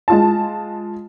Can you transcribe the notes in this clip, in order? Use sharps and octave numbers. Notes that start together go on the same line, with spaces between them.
G#3 F4 A5